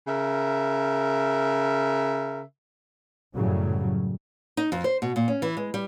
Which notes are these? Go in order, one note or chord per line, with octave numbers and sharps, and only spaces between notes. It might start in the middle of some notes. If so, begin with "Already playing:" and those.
C#3 A#4 E5
F#2 A2 C#3 F#3 G3
D#4
F2
C5
B2
A#2
C#4
E3
G#3
G3